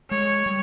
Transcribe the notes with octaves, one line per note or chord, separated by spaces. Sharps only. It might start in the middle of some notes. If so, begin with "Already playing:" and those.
G#3 C#5
G3